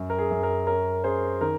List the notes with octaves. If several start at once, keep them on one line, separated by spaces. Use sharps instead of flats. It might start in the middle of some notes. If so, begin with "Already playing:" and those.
Already playing: F#2
A#4
G#4
F#2
A#4
C#4 A#4
C#4 G#4 C5
D#3 A#4